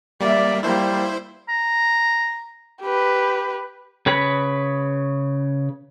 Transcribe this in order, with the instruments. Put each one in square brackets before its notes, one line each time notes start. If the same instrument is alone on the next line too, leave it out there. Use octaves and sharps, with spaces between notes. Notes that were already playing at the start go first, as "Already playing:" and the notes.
[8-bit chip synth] G3 A#3 [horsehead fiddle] D5 E5
[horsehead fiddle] G3 A#3 [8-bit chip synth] E4 C5
[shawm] A#5
[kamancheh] G4 B4
[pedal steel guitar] C#3 B4 C#5 B5